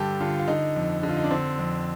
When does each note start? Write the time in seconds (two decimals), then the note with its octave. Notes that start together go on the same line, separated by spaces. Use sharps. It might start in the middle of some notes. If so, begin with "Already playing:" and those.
Already playing: G2 D3 G4 A4
0.20 D3 F4
0.39 F4
0.48 D3 D#4
0.76 F2
1.03 D3
1.09 F4
1.17 D#4
1.24 D4
1.31 D3 C4
1.59 F2